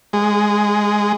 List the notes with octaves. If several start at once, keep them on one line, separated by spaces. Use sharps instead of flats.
G#3